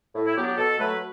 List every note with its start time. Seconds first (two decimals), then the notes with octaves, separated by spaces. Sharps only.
0.15 A2
0.25 E4
0.36 F#3 B3 D4 G4
0.47 G4
0.57 B2 A4
0.79 F#3 A3 B4